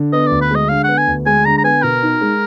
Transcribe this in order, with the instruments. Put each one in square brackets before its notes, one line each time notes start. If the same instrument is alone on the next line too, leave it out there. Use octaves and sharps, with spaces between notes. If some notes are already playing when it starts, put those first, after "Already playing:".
Already playing: [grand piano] D3
[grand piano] B3 [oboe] D#5
[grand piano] D2 [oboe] D5
[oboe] B4
[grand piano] G#3 [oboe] D#5
[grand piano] D3 [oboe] F5
[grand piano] B3 [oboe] F#5
[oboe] G#5
[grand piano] D2
[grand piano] G#3 [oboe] G#5
[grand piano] D3 [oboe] A#5
[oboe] A#5
[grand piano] B3 [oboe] G#5
[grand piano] B2 [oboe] A#4
[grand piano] D#4
G#3